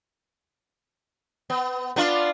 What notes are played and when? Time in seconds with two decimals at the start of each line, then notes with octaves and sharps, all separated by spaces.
1.50 B3
1.96 B3 D4 F4